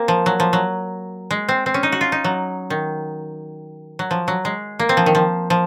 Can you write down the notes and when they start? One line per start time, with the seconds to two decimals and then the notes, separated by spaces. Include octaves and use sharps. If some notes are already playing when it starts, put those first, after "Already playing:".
Already playing: A#3 C4
0.08 F3
0.26 F#3
0.40 F3
0.53 F#3
1.31 G#3
1.49 C4
1.66 C4
1.74 C#4
1.83 D#4
1.92 F#4
2.01 F4
2.12 D#4
2.24 F#3
2.70 D#3
3.99 F#3
4.11 F3
4.28 F#3
4.45 G#3
4.79 A#3
4.89 C4
4.97 F3
5.06 D#3
5.15 F3
5.50 F3